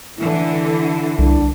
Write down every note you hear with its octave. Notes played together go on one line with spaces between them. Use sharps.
D3 E3 E4
C2 D4